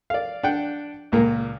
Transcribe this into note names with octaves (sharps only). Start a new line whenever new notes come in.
D5 F5
D4 F#5 G5
C#2 A#2 A#3